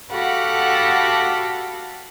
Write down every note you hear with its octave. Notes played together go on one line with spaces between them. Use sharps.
F#4 G4 A4 F5 F#5 B5